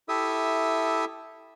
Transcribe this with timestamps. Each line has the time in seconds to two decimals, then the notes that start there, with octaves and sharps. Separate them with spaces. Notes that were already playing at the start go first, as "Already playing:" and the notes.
0.09 E4 G4 A4 E5 D#6 E6